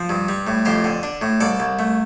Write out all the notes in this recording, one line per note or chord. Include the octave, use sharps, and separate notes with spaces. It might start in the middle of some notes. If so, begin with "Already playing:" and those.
Already playing: F3
G2
G3
A2
F2 G4 C5
D3
D4
A2
C2 A4 D5
C2
A3